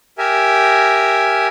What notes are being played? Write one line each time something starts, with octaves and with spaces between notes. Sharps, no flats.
G4 A#4 E5 G#5